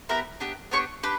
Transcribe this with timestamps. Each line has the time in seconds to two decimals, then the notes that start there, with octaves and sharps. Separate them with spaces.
0.09 B3 E4 G4 A#4 A#5
0.40 B3 D4 G4
0.71 B3 D4 G4 C#5 C#6
1.03 D4 G4 B4